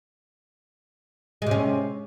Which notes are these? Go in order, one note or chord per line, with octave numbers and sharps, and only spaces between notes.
C3 G#3 C#4